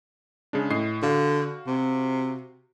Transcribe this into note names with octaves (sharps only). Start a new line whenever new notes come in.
C#3 G#3 D4
A2 D#5 C7
D3 F#4 F5
C3